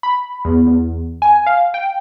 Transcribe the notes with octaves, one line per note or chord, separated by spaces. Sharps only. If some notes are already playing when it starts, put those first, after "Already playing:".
B5
E2
E2
G#5
F5
G5